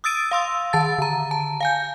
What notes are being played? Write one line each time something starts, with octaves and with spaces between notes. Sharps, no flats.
D#6 E6 A6 D7 D#7
F5 C6 E6
D#3 A5 A6
D3 A#5
A5
F5 G#5 G6